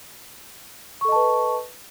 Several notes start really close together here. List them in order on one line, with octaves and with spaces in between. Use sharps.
C#6 A4 D#5 A5 B4